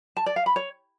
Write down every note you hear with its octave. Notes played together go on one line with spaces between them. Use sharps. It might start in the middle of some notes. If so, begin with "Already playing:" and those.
A5
D5
F5
B5
C#5